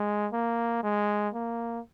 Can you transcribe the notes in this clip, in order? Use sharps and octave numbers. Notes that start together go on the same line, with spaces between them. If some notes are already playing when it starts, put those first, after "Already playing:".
Already playing: G#3
A#3
G#3
A#3